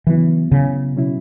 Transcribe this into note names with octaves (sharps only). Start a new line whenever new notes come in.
C#3 E3 F#3 B3 E4
C#3
B2 F#3 C#4 E4